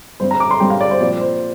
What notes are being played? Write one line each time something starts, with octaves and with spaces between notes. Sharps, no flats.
G2 G3 C4 C5
A#5
D6
C6
G2 G3 C4 G5
F5
D5
C5
A#2 F3 C4 D5
C5